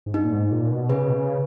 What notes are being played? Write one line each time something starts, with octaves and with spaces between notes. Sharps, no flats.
G#2
G2 D#4
A#2
G#2
A#2
B2
C#3 G#4 B4
B2
C#3